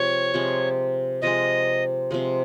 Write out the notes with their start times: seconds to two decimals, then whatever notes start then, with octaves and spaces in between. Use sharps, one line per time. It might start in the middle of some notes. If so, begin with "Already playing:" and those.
Already playing: C3 F3 G#3 C#5
0.34 C3 F3 G#3
1.22 C3 F3 G#3 D#5
2.11 C3 F3 G#3